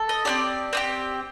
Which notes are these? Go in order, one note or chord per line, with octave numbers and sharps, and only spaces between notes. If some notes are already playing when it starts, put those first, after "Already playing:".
Already playing: A4
D#5
C4 D#4 G4 D5
C4 D#4 G4